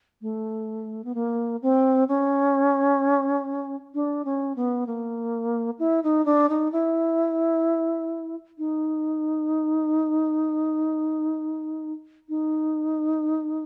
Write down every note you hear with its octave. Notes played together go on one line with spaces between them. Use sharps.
A3
B3
A#3
C4
C#4
D4
C#4
B3
A#3
E4
D#4
D4
D#4
E4
D#4
D#4